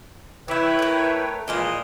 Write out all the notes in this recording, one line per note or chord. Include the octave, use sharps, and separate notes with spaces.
E3 E4 B4 C#5 E5 G5
A3 A#4
A#2 E3 F3 G#3 D#5